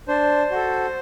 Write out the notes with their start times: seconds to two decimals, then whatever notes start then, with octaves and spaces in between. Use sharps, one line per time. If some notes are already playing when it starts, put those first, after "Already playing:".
0.08 D4 C5
0.51 F#4 A4